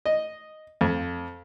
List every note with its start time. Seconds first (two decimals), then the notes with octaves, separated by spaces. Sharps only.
0.05 D#5
0.81 F2